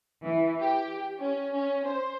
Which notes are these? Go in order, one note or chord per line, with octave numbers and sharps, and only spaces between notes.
E3
G4
C#4
C#4
C5